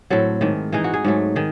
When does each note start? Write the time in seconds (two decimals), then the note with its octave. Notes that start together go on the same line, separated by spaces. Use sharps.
0.10 A2 F#3 C4 A4
0.41 G#2 D#3 A3
0.73 E3 G#3 D#4 G#4
0.84 F#4
0.94 G#4
1.05 G#2 F#3 A3
1.36 D#3 G#4